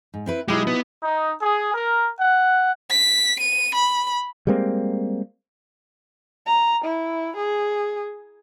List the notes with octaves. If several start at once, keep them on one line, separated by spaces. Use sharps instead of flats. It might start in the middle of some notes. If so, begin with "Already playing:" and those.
G#2
C4 E4 B4
B2 F#3 G#3 D#4 E4 G4
B3
D#4
G#4
A#4
F#5
B6
D#7
B5
G3 G#3 A#3 C4
A#5
E4
G#4